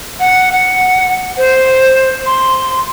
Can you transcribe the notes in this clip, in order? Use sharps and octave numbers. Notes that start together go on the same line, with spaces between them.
F#5
F#5
C5
C6